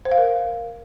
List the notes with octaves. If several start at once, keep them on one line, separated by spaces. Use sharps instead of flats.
C5
F5
A#4